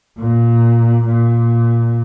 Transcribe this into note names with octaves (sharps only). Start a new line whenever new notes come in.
A#2
A#2